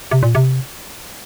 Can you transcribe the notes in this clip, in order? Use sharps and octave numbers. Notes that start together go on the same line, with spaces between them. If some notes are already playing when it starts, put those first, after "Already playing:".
C3
A#2
C3